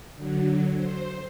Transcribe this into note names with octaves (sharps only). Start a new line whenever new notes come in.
D3 F#3
C5